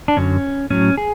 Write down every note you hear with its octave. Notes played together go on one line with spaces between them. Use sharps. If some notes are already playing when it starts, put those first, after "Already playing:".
D4
F#2 D3 F#3 C#4
A2 F#3 C#4
G#4